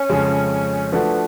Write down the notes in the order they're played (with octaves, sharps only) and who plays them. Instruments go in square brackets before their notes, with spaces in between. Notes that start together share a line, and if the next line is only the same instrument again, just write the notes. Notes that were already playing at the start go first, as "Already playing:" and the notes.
Already playing: [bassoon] C#4
[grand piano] F2 C#3 G#3
[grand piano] F3 A3 D4 F#4 A4 [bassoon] B3